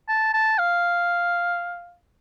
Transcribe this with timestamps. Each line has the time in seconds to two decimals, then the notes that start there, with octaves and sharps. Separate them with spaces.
0.09 A5
0.33 A5
0.59 F5